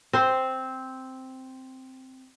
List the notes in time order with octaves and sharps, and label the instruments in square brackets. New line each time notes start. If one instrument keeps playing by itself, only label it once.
[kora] C4 C5